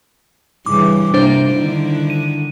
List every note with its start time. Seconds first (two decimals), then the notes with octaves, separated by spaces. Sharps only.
0.66 G2 C#3 E3 D6
1.14 C3 A#3 D4 C5
1.52 D3 D#3 E4
2.10 D#7